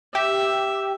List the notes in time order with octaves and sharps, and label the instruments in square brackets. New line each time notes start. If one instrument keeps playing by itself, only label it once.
[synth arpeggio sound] G4 [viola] E5